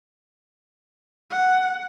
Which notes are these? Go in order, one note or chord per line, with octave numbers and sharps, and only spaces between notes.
F#5